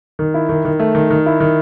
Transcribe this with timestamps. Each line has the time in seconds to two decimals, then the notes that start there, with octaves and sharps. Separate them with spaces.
0.19 D#3
0.34 E4
0.49 D#3
0.65 D#3
0.79 A3
0.95 D#3
1.10 D#3
1.26 E4
1.40 D#3